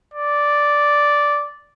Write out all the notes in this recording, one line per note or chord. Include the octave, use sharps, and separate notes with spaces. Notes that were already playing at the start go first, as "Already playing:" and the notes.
D5